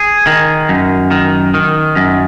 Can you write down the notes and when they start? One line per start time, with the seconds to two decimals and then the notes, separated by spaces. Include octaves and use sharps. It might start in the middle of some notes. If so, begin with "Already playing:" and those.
Already playing: G#4
0.27 D#3
0.69 F#2
1.11 D#3
1.54 D#3
1.96 F#2